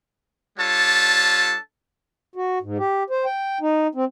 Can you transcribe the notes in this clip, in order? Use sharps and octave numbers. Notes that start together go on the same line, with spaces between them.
G3 D4 F4 A4 C#5 A5
F#4
G#2
G4
C5
G5
D#4
C4